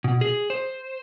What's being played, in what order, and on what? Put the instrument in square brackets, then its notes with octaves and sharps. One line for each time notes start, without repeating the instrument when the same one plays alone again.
[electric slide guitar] B2
G#4
C5